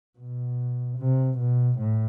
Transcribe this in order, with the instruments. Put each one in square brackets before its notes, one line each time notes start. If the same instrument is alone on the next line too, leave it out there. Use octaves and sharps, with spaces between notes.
[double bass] B2
C3
B2
A2